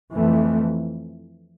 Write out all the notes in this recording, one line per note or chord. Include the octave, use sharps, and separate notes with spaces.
F2 E3 A3